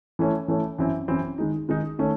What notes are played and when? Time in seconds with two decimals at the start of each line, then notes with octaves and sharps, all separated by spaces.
0.19 E3 A3 C#4
0.48 E3 A3 C#4
0.78 F#2 E3 C4 E4
1.08 F#2 E3 C4 E4
1.38 D#3 G#3 D#4
1.69 D#3 G#3 D#4
1.99 D#3 A3 C#4